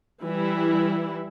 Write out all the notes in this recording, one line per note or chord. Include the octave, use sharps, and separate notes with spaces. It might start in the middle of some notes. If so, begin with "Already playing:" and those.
E3 G3 E4